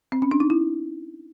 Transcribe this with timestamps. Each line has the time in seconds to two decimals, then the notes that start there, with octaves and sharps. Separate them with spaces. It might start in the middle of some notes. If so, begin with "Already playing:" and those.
0.12 C4
0.22 C#4
0.31 D4
0.40 D#4
0.50 E4